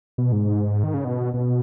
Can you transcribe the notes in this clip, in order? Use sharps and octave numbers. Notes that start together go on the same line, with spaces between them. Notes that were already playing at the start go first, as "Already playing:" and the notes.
B2
G#2
D#3
C#3
B2
B2